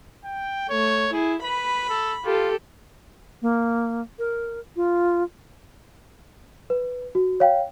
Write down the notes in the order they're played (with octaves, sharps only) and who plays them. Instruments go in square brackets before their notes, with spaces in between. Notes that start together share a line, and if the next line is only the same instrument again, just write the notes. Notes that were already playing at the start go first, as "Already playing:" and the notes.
[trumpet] G5
[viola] A3 [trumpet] C#5
[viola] E4 [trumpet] G#4
[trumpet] B4 [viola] B5
[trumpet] A4
[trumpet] F4 [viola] G4 A4
[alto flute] A#3
A#4
F4
[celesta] B4
F#4
C#5 F5 G5